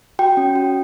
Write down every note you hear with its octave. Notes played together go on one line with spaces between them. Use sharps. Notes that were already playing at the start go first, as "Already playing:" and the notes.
F#4 G5
C#4
F#4